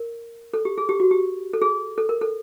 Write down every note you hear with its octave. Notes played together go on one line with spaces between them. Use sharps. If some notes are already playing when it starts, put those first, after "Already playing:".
Already playing: A#4
A4
G4
G#4
G4
F#4
G4
A4
G#4
A4
A#4
A4